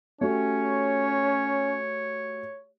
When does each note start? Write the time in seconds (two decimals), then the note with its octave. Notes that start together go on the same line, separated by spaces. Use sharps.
0.21 A3 C#4 F#4 G4 C#5